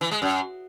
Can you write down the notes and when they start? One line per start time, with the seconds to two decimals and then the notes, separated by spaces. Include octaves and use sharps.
0.01 E3
0.11 G#3
0.22 F#2